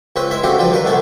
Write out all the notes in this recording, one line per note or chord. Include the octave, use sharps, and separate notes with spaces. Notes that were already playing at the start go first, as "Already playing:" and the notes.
C#2 C4 C#4 B4
G#3 E4 E5
D2 C#3 C4 C#4 F#4 G4
F3 G3 B4
D#3 A#4 B4
C2 D3 A3 B3 G#5